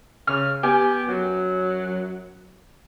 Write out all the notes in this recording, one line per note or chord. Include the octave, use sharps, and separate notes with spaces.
C#3 F6
B3 G4 G#5
F#2 F#3